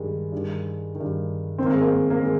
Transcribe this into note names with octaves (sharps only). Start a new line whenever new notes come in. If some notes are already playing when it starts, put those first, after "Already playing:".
Already playing: G2 D#3 G3 G#3
G2 D#3
D#3
G2
G#2 D#3 C4
A#3
G#3
A#3
A#3
D#3 G#3